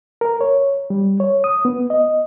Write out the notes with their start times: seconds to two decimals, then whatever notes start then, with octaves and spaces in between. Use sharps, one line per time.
0.21 A#4
0.41 C#5
0.90 G3
1.20 C#5
1.44 D#6
1.65 B3
1.90 D#5